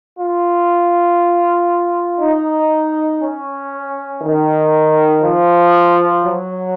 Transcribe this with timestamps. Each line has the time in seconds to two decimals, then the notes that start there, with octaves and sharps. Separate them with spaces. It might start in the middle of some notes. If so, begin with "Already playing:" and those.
0.19 F4
2.20 D#4
3.21 C#4
4.22 D#3
5.23 F3
6.24 F#3